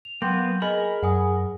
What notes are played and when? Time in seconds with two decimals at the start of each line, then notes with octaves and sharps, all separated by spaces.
0.05 F7
0.22 F#3 A#3 B3 G5 C6 G6
0.62 G#4 A#4 D#5 G#5 B5
1.03 F#2 F#5 G#5 D#6